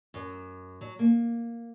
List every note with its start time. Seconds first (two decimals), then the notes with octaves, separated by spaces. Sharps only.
0.14 F#2
0.81 F#3
0.99 A#3